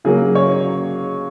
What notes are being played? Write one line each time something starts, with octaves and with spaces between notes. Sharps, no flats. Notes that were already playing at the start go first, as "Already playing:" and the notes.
C#3 F#3 A#3 G#4
C#5